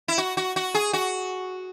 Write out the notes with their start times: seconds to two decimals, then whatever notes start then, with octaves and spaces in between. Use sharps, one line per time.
0.08 E4
0.18 F#4
0.37 F#4
0.56 F#4
0.74 G#4
0.93 F#4